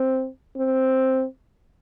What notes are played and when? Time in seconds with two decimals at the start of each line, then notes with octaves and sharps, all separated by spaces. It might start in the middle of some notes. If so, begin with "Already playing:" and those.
Already playing: C4
0.57 C4